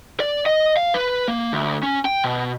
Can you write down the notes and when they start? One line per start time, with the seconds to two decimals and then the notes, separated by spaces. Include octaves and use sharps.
0.20 D5
0.46 D#5
0.77 F5
0.94 B4
1.28 A#3
1.53 D2
1.83 C#4
2.05 G5
2.24 B2